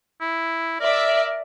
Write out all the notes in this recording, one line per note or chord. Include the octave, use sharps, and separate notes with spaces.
E4
A#4 D5 E5